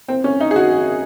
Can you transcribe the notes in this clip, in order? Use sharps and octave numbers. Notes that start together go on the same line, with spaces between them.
C4
C#4
D#4
G#4
F#4